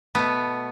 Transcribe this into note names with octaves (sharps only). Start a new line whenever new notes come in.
B2 A3 B3